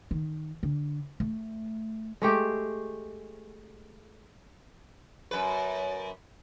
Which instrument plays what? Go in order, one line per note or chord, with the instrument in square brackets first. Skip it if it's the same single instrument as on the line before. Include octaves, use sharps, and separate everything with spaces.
[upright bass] D#3
D3
A3
[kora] G#3 A3 G4
[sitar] F#2 B4